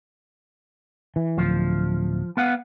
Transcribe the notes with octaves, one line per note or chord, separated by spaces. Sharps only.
E3
D1 F3
B3 F5 F#5